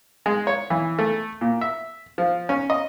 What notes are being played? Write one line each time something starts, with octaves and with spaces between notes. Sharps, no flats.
G#3
C#5
E3
A3
A#2
E5
F3
C#4
D#5